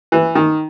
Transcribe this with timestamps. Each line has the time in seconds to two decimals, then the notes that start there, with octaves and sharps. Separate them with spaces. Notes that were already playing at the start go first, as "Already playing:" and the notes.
0.12 E3
0.35 D#3